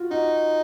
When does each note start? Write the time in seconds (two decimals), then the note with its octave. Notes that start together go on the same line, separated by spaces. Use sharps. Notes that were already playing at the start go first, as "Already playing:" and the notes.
Already playing: F4 F#4
0.11 D#4 F#4